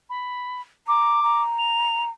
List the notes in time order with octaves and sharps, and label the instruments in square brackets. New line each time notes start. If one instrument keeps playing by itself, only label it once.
[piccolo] B5
[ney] A#5 [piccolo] D6
[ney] A#5
[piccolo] F7